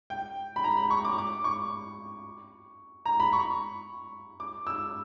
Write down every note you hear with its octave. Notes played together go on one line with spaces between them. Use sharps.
G5
B5
A#5
B5
C#6
D6
D6
C#6
A#5
B5
C#6
D6
E6